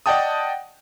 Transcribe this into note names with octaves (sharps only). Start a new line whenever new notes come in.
D5 D#5 F#5 G5 A5 D#6